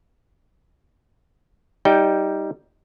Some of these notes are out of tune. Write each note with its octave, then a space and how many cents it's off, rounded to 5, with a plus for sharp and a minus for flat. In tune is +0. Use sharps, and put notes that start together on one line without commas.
G3 +0 D#4 +15 G5 +0